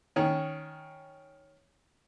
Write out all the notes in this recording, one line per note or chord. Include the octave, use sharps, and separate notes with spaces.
D#3 C#4